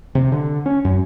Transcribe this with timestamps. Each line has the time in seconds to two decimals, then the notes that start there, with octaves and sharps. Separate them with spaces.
0.15 C3
0.32 D3
0.66 C#4
0.85 F#2